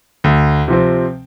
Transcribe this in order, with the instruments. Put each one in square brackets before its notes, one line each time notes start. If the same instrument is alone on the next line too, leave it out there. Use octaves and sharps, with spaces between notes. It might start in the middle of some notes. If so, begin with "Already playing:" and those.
[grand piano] D2
C3 F3 C4